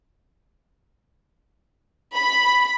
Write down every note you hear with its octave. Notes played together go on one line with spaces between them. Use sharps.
B5